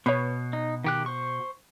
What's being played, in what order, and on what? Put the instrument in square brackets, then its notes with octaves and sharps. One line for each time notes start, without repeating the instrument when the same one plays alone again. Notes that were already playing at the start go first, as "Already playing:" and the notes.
[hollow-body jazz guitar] B2 [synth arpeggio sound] B4 C#5
[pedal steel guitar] D#4
D#3 G4 F#6
C5 C#6